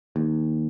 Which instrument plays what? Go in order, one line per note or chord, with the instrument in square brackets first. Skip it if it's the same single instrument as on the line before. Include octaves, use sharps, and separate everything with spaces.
[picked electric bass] D#2